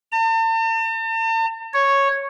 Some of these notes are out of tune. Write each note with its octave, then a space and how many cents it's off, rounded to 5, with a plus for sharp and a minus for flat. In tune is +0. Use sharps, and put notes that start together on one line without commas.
A5 +45
C#5 -5